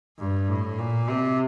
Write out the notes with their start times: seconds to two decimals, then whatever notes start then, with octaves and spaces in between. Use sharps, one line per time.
0.18 G2
0.49 A2
0.79 A#2
1.10 C3